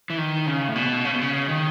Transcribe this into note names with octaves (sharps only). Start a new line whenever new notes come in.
E3
D#3
C#3
A2
B2
C#3
B2
C#3
D#3